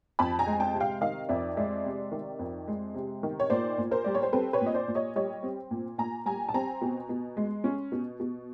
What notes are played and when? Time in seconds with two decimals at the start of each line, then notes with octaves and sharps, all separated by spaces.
0.19 F2 A5 B5
0.39 G#5 A#5
0.47 G#3
0.60 G5 A5
0.74 C3
0.80 F5 G5
1.01 D#3 D#5 F5
1.29 F2 D5 E5
1.57 G#3 D5 E5
1.85 C3
2.12 D#3
2.39 F2
2.68 G#3
2.94 C3
3.23 D#3
3.40 C#5
3.50 A#2 C5 D5
3.78 A#2
3.91 A#4 C5
4.04 G3 D5
4.15 C#5
4.23 C5
4.33 C4 A4 B4
4.53 B4 C#5
4.61 A#2
4.66 D#5
4.74 C5 D5
4.88 A#2
4.95 C#5 D#5
5.16 G3 C#5 D#5
5.43 C4
5.71 A#2
5.98 A#2 G#5 A#5
6.26 G3 G#5 A#5
6.49 A5
6.54 C4 G#5 A#5
6.81 B2
7.09 B2
7.37 G#3
7.64 C#4
7.92 B2
8.20 B2